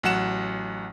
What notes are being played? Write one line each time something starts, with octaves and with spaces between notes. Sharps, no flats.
A1 F#3 F#5 E7